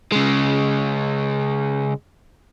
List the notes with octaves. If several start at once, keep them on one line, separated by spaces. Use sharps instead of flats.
C#3 G#3